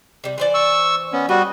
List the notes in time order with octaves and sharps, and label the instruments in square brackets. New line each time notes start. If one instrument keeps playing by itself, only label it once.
[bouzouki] C3 G3
E3 C5 D5
[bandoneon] C#6 E6
B3 C#4
[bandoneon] G3 F#4 [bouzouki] D#5